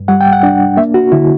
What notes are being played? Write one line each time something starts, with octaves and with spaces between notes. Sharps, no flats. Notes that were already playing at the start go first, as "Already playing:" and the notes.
Already playing: G2
G3 F#5
G5
F#5
D4
A#3 E5
F#4
D3 E4